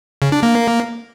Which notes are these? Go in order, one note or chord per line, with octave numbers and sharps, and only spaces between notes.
C#3
D4
A#3